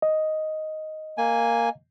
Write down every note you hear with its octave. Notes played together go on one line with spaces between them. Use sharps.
D#5
A#3 G#5